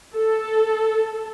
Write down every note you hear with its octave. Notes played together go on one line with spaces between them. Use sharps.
A4